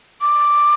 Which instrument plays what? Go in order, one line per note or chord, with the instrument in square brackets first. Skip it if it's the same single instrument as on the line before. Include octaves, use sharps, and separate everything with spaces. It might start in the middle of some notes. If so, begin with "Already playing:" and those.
[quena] D6